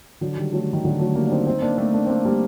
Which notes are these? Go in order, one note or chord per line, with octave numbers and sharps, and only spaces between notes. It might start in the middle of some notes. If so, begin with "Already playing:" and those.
D3 F#3
D#3 G3
F#3 A3
D#3
D3 F#3
F#3 A3
G3 A#3
D4
C4 D#4
C4 D#4
A#3 D4
A3 C4
A#3 D4
C4
A#3 D4
G3 A#3